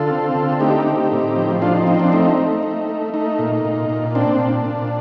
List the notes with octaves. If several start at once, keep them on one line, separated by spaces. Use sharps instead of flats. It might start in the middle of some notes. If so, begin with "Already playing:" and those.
Already playing: D3 F4 A4
C4
D3
A3 D#4 G4
C4
A2
F3
F3 D4 F4
D#4
C4 D#4
D4
A3 D#4
A3
A3
A3
A3 D#4
A#2
A#2
A#2
C4 D4
A#2
A#2